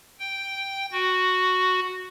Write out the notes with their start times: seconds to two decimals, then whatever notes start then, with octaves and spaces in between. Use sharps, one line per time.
0.19 G5
0.92 F#4